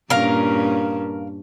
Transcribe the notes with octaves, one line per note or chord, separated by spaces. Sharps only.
G2 A#2 C#4 A#4 F5